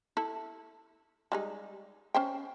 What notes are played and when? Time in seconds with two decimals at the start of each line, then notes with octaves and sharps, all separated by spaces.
0.17 E4 A4
1.32 G3 G#3 D#4
2.14 C#4 C5 G5